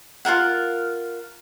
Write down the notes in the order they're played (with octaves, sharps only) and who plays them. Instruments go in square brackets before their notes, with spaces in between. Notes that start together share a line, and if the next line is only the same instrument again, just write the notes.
[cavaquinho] F4 A4 A#4 F#5